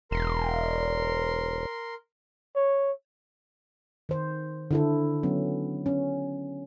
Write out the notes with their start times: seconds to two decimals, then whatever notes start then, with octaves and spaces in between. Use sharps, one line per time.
0.11 E1 A#4 C6
2.56 C#5
4.09 D#3 C5
4.71 D3 E4 A4
5.23 F#3 B3 C#4
5.86 C#4